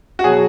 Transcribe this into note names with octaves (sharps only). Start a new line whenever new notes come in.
F#4
B2 F#3 G#4